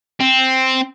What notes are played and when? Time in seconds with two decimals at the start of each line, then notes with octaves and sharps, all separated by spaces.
0.20 C4